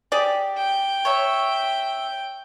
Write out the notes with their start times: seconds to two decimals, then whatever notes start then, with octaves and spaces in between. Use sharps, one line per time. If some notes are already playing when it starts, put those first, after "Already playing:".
0.12 G4 G#4 D5
0.57 G5
1.05 C#5 E5